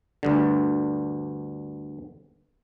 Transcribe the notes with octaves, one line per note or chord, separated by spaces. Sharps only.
D2 G2 D3